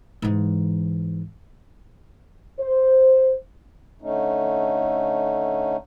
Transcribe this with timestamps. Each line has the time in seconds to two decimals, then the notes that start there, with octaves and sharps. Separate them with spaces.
0.22 G#2 E3
2.60 C5
4.02 D3 A3 C#4 D#4